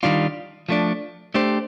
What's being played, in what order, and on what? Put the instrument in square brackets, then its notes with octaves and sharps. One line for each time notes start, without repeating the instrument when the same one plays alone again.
[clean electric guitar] D#3 G3 D4 F4
F3 A3 D4
A3 D4 G4 C5